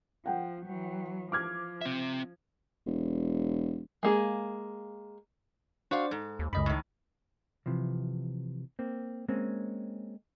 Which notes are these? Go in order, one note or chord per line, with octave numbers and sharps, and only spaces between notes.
F3 F#5 G5
E3 F#3
F3 D6 F6 G#6
C4 E5
E1
G#3 A#3 G#4
D4 F#4 C5 D5 F5
G#2 A4
D#2
C#2 F#2 D#5 B5
A2 D#3
C3 E3 F3
A#3 C4
G#3 A#3 C4 C#4